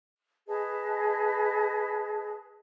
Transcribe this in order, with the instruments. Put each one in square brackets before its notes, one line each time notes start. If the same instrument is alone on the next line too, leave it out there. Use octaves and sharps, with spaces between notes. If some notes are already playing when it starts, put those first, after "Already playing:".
[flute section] G#4 B4 D#5 A5